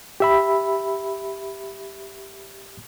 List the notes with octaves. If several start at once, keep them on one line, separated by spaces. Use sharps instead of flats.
G4 E5 B5